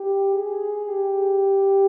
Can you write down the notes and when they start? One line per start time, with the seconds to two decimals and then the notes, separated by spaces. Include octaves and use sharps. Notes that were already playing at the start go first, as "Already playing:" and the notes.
Already playing: G4
0.35 G#4
0.89 G4